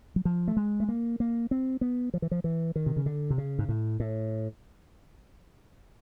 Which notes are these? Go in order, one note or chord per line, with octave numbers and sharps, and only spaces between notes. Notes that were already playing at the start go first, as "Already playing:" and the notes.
F#3
F3
A3
G#3
A3
A#3
A#3
C4
B3
F3
E3
F3
E3
D#3
C3
C#3
D3
C3
C#3
G#2
A2
A2